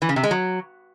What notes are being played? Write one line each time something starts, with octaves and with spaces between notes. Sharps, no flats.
E3
C#3
C3
G#3
F#3